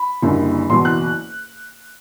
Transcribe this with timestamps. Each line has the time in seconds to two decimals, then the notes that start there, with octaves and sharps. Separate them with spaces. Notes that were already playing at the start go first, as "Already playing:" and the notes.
Already playing: B5
0.22 F#1 F#2 D3 G3 A#3
0.70 F#1 E2 B2 F#3 C6
0.85 F#6